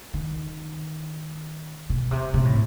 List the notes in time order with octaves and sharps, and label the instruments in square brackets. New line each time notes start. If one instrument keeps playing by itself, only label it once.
[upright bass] D#3
B2
C3
C3
A2